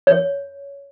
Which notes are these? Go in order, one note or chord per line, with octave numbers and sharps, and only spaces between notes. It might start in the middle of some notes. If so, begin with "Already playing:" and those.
C#5